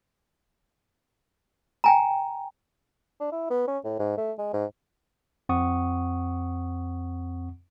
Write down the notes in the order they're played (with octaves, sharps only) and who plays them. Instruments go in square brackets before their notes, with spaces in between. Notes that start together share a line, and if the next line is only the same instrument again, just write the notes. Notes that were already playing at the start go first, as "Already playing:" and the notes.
[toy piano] G5 G#5 A#5
[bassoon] D4
E4
B3
C#4
A2
G#2
A3
G#3
G#2
[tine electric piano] F2 C4 F#5 C#6 D#6